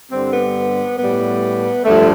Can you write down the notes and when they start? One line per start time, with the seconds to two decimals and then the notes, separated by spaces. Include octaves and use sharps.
0.11 G2 D3 G3 C4
0.33 B3
0.99 A2 G3 B3
1.85 G2 D3 F3 A3